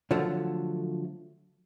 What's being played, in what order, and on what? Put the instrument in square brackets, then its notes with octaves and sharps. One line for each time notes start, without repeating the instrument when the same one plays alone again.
[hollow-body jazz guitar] D3 F3 F#3 A3